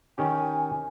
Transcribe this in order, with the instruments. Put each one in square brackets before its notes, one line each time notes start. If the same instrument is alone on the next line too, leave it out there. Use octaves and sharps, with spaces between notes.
[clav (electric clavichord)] D#3 C#4 G4 [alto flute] G#5